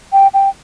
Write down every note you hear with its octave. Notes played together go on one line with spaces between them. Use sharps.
G5
G5